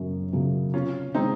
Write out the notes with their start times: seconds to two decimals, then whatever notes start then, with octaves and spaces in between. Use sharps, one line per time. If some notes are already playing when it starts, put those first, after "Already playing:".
Already playing: F#2 C#3 F#3 C#4
0.33 C#3 F#3 C#4
0.74 C3 C#4 F4
1.14 D#3 G#3 C4 D#4